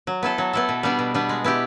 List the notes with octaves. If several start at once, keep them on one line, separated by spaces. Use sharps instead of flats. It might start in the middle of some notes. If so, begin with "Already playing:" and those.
F#3
B3 E4 A4
F#3
B3 E4 A4
B2
G3 B3 D4
B2
G3 B3 D4
G#3
B3 E4 G4